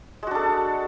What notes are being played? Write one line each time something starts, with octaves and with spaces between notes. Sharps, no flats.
G#3 D4 F#4 A4